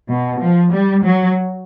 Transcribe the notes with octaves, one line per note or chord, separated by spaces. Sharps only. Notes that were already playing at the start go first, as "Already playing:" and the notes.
B2
F3
G3
F#3